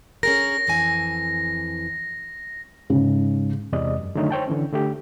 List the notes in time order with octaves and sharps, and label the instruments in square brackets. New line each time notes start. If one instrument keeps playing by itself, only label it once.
[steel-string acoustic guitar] C#4 G#4 A#4 [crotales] A#6
[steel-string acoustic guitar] F2 E3 G#5
[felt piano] G#2 C#3
[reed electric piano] E2 C3 G#3 D5 D#5
F#2
D3 D#3 F#3 A3 D#4 C#5
C5 C#5 G5 A5
D3 E3 C#4
D3 A3 G4